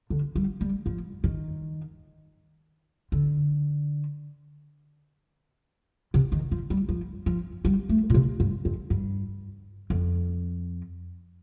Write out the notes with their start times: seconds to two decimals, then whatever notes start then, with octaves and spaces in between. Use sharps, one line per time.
0.10 D3
0.36 G3
0.61 G3
0.86 F3
1.24 D#3
3.12 D3
6.14 C3
6.32 D#3
6.51 F3
6.70 G3
6.89 F3
7.26 F3
7.65 G3
7.89 A3
8.10 A#2
8.14 C3
8.40 G2
8.65 F2
8.90 G2
9.90 F2